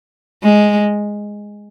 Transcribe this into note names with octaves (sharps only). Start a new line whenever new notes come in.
G#3